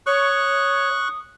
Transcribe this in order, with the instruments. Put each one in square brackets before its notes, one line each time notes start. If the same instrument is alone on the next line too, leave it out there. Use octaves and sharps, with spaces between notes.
[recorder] C#5 [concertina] C#6 F#6 [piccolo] D#6